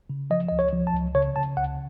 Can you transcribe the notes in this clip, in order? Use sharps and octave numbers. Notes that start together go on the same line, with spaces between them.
C#3
F3 D#5
C#2 D#5
C#5
F3
A5
C#2
C#3 C#5
C#3 A5
C#2 F#5